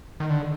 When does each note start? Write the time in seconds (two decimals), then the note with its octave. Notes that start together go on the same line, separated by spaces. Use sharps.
0.20 D#3
0.30 D3